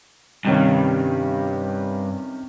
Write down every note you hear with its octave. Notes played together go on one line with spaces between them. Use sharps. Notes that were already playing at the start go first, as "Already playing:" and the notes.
G2 C3 D#3 C#4